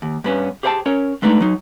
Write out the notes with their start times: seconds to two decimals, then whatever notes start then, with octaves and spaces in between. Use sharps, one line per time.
0.02 D#2
0.24 G2 B3 C#4
0.63 G4 G#4 C5 F#5 G5 A5
0.86 C#4 A#4 C#5
1.22 G#3 A3 B3 D4 D#4
1.40 F#3 D#4